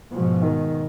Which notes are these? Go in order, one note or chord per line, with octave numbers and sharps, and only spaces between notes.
G#2 B2 F3
D#3